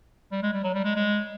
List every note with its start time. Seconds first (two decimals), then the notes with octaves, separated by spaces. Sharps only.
0.32 G3
0.43 G#3
0.53 G3
0.64 F#3
0.74 G3
0.84 G#3
0.96 G#3